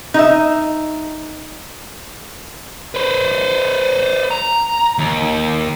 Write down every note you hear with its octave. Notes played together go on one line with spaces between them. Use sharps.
D#4 E5
B4 C5
A#5
D#2